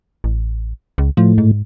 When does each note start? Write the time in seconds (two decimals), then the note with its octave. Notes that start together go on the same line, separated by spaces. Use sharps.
0.24 A1
0.98 C#2
1.17 A2 F3
1.38 G#2